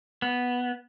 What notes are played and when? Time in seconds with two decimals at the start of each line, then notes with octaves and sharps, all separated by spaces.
0.22 B3